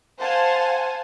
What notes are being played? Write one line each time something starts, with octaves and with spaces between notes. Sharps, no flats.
C5 F5 F#5 G#5 A5